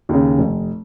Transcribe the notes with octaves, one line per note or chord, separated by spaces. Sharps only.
D#2 C#3
F1